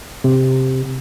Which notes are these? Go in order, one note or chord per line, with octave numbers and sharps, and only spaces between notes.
C3